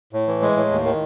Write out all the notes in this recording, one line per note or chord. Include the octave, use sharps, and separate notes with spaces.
A2
E3
G#3
A2
D#2
D#3